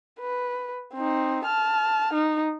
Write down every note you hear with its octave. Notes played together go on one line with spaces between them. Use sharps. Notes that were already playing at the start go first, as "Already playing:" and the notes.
B4
C4 D#4
A5 F6
D#4